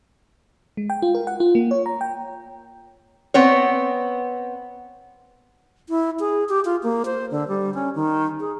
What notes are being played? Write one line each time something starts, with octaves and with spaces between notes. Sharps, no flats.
G#3
G5
F4
A#4
F#5
F4
A#3
C#5
A#5
G5
B3 C4 C#5
E4
G#4
G4
F4
A#3
C5
D3
G3
C#4
D#3
G#4